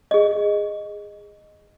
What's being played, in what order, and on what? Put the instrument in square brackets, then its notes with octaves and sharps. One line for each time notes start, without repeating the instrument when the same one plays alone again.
[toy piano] G#4 D#5